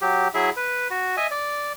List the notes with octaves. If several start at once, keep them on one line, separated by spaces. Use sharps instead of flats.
F#3 G4
F#3 E4 G#4 E5
B4
F#4
D#5 E5 G#5
D5